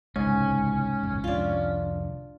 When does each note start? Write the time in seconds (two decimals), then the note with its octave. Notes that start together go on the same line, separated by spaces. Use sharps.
0.16 C2 G#2 C#3 C#4
1.03 F#1 B1 E2
1.24 C2 F2 D4 F4